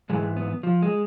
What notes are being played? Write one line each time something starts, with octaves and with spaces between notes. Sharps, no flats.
G#2 E3 G#3
B3
F3
G#3